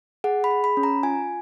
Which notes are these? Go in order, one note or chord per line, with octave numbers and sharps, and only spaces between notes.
G#4 F#5
B5
G#4
B5
C#4
A#5
F4 G#5